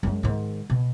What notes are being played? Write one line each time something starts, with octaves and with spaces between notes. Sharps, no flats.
F#2 G#3
G#2 D#3
B2